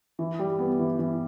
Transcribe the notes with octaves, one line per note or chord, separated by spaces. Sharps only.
E3
G3
B3
E3
E3